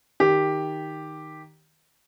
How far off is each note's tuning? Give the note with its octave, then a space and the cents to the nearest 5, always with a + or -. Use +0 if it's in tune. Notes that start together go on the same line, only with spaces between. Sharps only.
D#3 +0 G4 +0